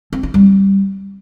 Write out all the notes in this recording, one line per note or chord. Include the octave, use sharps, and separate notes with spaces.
C4
E4
G3